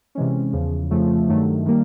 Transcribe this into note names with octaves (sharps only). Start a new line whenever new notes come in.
C3 E3 G#3 C#4
E2 C#3 F3
F2 C#3 F3 A3
G2 D#3 F#3 A3
D#3 G3 A#3